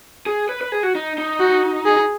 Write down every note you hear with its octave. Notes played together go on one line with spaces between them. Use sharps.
G#4
B4
B4
G#4
F#4
D#4
D#4
F#4
G#4